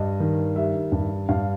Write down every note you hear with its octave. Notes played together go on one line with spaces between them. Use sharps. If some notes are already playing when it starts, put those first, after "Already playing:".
Already playing: G2 D#5
D#3
G3 E5
G2
G2 F5